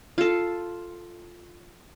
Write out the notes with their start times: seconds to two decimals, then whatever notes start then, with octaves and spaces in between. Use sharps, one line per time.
0.18 F4 A4